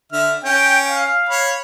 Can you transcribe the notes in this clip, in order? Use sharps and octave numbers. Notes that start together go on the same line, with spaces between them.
D3 E5 F6
C#4 G5
F5
C#5 B5